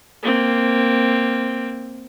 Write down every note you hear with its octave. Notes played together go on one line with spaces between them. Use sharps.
A#3 C4